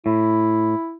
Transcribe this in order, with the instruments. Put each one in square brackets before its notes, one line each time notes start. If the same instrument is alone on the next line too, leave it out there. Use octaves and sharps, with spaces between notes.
[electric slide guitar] A2 [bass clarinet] E4